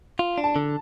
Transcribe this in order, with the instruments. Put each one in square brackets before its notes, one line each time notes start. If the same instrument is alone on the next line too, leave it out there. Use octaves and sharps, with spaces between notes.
[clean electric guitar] F4
D4
[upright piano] A5
[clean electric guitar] D3